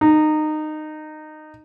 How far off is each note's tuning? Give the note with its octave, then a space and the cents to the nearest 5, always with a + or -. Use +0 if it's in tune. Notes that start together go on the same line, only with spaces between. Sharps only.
D#4 -20